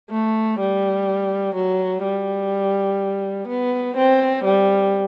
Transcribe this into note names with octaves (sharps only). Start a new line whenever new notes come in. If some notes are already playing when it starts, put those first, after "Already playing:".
A3
G3
F#3
G3
B3
C4
G3